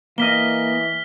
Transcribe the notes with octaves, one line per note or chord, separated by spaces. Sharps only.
E3 A#3 D#5 F6 B6 G7